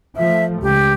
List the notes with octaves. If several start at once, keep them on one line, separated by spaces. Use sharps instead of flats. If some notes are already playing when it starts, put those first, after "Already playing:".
F3 A3 E5
C#2 G4